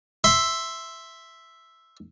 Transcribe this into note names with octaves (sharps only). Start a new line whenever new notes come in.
E5 C6